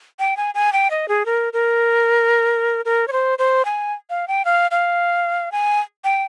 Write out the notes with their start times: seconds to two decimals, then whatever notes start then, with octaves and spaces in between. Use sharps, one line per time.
0.19 G5
0.37 G#5
0.55 G#5
0.73 G5
0.91 D#5
1.08 G#4
1.26 A#4
1.53 A#4
2.85 A#4
3.08 C#5
3.13 C5
3.39 C5
3.65 G#5
4.10 F5
4.28 G5
4.45 F5
4.71 F5
5.52 G#5
6.04 G5